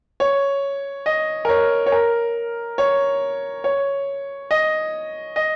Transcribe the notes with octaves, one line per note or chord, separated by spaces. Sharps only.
C#5
D#5
A#4
C#5
C#5
A#4
C#5
C#5
D#5
D#5